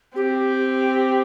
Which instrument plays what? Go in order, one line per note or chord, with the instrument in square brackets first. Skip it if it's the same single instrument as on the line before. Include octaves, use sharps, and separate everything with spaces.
[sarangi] C4 [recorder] G4